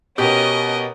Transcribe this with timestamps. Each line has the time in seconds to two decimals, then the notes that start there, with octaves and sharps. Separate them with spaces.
0.18 B2 C#4 G4 A#4 D#5